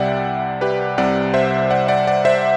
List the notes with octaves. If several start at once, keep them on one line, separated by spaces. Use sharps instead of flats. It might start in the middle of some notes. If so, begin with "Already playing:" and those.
Already playing: C2 C3 G3 D5 E5 F#5 G5
G4 B4
C2 C3 G3 D5 F#5
C5 E5
D5 F#5
D5 F#5
D5 F#5
C5 E5